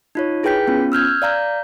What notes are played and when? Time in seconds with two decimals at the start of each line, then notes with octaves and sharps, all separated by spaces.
0.15 D#4 F4 C#5
0.43 E4 G#4 B4 G5 G6 B6
0.67 B3 C#4 F4
0.92 E6 F6 G6 G#6
1.22 D5 F5 A#5 G6